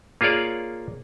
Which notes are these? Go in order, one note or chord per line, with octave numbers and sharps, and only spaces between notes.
A#3 F4 G#4 C#5 D5